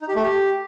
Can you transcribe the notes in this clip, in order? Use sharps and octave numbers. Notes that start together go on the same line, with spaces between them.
D#4
G4
A3
G4